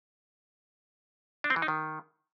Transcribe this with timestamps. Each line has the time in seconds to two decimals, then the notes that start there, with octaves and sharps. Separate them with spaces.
1.44 D4
1.50 C4
1.56 E3
1.62 D#4
1.68 D#3